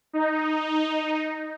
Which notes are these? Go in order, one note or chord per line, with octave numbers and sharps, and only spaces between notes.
D#4